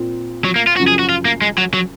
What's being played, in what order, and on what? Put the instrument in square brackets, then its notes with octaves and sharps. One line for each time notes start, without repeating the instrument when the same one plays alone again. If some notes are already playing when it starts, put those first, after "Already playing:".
Already playing: [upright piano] A#2 C4
[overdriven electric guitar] F#3
A#3
F4
[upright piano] F#2 C#3 F3 [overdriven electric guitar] F#4
[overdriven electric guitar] G#4
F#4
F4
A#3
G#3
F#3
F#3